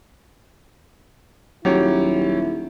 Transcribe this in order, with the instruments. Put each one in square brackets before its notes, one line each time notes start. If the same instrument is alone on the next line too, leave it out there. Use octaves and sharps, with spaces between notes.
[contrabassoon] D#1 [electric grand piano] F#3 G4 C#5 [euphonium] E4